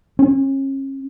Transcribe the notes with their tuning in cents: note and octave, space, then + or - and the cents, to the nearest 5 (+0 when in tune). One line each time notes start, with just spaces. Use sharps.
C#4 -35